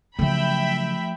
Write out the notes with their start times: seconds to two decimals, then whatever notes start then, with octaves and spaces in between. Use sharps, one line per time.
0.19 C#3 F3 F#3 A3 E5 G5 B5